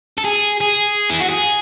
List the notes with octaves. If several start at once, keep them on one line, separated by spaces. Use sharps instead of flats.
A4
G#4
G#4
E4
F#4
G#4